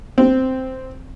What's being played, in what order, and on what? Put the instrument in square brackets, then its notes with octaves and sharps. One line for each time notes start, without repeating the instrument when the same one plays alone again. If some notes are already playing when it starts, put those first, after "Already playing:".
[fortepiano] C4